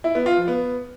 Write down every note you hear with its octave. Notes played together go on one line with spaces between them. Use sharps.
E4
B3
F4
F3
B3